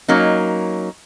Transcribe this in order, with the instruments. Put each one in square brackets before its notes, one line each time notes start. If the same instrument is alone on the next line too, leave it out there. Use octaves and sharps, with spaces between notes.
[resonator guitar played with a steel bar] F#3 A#3 C#4 D#4